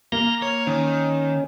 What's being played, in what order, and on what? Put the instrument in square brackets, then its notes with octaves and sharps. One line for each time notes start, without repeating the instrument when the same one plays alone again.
[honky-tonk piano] A#3 [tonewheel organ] F6 G6 A#6
[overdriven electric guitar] C#5 [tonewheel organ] F6
[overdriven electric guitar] D#3 [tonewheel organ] C#4